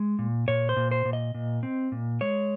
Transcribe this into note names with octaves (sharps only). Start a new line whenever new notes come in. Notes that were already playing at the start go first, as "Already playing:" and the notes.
Already playing: G#3
A#2
A#2 C#5
C5
A#2
C5
A#2
D#5
A#2
C4
A#2
G#3 C#5